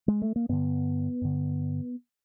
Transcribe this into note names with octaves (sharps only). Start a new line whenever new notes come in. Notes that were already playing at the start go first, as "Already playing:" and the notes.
G#3
A3
A#3
G2 D3 B3
G2 D3